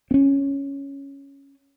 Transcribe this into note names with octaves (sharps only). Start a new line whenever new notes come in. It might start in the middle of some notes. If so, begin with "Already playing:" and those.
C4 C#4